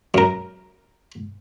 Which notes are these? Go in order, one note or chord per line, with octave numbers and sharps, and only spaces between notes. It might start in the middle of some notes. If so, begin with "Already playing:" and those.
F#2 A#4